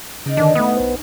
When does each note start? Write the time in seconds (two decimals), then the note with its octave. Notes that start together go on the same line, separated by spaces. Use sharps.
0.26 C#3 C#4 D#4 D5 F5
0.37 G2 B2 D3 D#3 D4 G#4
0.55 A3 B3 D#6
0.77 B1 B4 C5